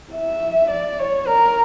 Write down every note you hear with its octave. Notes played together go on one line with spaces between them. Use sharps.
E5
D5
C#5
A#4